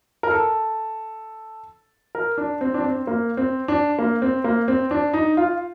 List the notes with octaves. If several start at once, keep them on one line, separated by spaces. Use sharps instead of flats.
A#4
A4
A#4
D4
C4
D4
C4
A#3
C4
D4
A#3
C4
A#3
C4
D4
D#4
F4